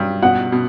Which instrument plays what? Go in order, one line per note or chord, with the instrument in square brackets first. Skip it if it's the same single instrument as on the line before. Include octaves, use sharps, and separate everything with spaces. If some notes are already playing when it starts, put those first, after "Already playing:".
Already playing: [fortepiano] G2 F#3
[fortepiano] B2 [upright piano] F#5
[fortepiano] B2